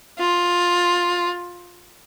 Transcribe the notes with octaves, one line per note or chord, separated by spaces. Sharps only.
F4